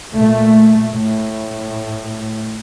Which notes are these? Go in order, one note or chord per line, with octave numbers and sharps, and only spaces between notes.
A#2 A3
A2